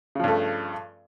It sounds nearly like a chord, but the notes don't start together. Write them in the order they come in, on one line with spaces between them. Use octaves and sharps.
C#3 F3 G2 A3